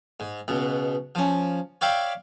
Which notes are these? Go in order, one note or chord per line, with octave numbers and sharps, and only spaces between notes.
G#2
C#2 B2
F3 C#4
C#5 D5 E5 F5 G5 B5